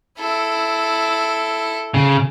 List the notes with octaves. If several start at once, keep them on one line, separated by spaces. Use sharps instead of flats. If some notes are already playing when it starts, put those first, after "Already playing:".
E4 A4
C#3